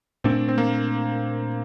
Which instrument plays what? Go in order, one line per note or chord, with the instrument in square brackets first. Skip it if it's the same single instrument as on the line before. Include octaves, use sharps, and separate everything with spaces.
[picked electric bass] A#2 A3 D4 [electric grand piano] C4
[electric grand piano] C4
A#3